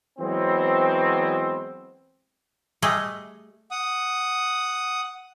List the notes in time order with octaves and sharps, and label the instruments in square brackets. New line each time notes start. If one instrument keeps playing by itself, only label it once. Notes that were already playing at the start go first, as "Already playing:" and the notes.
[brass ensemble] E3 F#3 G#3 B3 C4
[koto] G3 A3 G#4 D#5
[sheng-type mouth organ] F#5 D#6